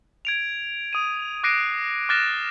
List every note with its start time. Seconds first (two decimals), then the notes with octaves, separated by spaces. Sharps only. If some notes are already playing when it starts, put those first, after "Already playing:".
0.25 G#6 D7 F7
0.93 D#6 D#7
1.44 D6 F#6 A#6 C7 D7 D#7
2.09 D6 F6 F#6 A6 A#6 E7